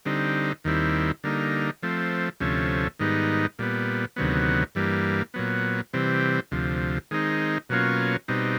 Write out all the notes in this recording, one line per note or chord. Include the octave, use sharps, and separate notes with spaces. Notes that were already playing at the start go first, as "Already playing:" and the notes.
D3 G3 C4 D#4
D#2 D#3 G3 C4 E4
D3 G3 A#3 D#4
F3 A3 C4
D2 C3 F3 A3 C#4
G#2 D#3 G3 B3 D#4
A#2 G3 B3
D2 C3 D#3 F#3 B3
G2 E3 G3 A#3
A#2 F#3 B3
C3 E3 G3 C4
D2 C3 F3
D#3 G#3 C4 D#4
B2 F#3 A#3 C#4 F4
B2 G3 C4 D#4